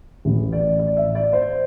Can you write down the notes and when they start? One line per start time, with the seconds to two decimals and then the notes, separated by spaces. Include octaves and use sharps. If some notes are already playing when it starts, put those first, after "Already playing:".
0.25 A1 A2 E3
0.53 D5
0.79 D5
0.97 E5
1.15 D5
1.33 C5